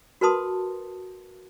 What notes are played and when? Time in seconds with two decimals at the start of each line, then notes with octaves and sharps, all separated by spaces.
0.21 F#4 A#4 B4 A5 C6 D#6